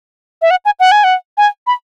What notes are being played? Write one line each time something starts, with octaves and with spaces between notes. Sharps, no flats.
E5
F#5
G#5
F#5
G#5
F#5
G#5
B5